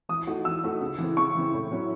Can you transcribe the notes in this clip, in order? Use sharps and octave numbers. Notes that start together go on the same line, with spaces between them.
E3 D#6
A3 D#4 F#4
E3 E6
A3 D#4 F#4
C#3
E3 C4 E4
C#3 C#6
E3 C4 E4
A2
F#3 C#4 E4